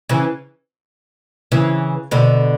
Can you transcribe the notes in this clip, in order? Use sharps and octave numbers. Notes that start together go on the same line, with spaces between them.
C#3 E3
C#3 E3
B2 D3